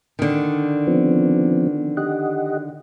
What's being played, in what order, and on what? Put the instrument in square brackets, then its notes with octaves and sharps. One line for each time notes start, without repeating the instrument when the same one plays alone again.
[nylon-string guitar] D3 D#3
[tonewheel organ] F3 B3 C4
G4 D#5 F#5